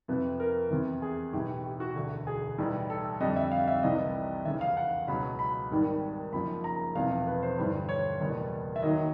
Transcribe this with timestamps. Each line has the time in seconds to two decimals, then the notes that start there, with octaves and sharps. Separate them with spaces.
0.08 F2 C3 F3 B4
0.40 A#4
0.70 E2 C3 E3
1.02 G#4
1.33 B1 A2 E3 G4
1.64 G4
1.80 F#4
1.95 E1 D2 D3
2.27 G#4
2.58 B1 A2 E3 G3
2.90 A4
3.20 F2 D3 G3 D#5
3.36 E5
3.52 F5
3.68 E5
3.83 C2 C3 E3 G3 D#5
4.45 F1 E2 C#3 E5
4.61 F5
4.77 F#5
5.08 C#2 B2 F#3 B5
5.39 B5
5.71 G#1 G#2 D#3 G3
6.33 F#1 F#2 C#3 F3 B5
6.64 A#5
6.95 E1 E2 C3 F3 F5
7.27 B4
7.43 C5
7.58 G1 G2 E3 G3 C5
7.89 C#5
8.20 F#1 E2 B2 G3
8.76 E5
8.82 D#2 D#3 F#3 D#5